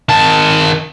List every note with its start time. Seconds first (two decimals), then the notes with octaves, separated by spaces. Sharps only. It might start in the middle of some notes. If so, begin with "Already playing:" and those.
0.09 D#3 A5